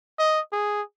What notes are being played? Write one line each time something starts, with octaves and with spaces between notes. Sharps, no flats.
D#5
G#4